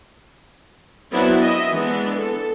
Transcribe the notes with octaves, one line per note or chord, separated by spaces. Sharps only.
F#3 B3 C4 D4 E4 F#4
D#5 E5
E3 G#3 B3 D4
A4